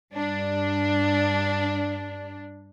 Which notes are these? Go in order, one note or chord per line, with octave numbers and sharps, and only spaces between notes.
G2 D4